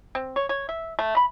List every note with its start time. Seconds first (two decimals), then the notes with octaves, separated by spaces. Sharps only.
0.15 C4
0.36 C#5
0.49 C#5
0.69 E5
0.99 A3
1.17 B5